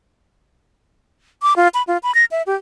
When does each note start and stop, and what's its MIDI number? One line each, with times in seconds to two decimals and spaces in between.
1.42 1.53 86
1.56 1.68 65
1.74 1.82 83
1.87 1.97 65
2.03 2.14 83
2.14 2.25 94
2.31 2.42 76
2.46 2.54 67